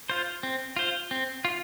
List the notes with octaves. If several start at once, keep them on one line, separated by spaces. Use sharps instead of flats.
F4 C5
C4
F4 C5
C4
F4